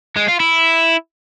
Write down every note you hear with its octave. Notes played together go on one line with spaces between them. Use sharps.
G#3
F4
E4